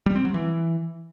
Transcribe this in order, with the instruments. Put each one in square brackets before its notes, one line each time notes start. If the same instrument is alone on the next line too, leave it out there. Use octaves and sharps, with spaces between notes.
[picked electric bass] G3
C4
F#3
E3